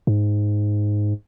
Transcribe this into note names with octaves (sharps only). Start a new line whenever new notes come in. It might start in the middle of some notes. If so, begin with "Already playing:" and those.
G#2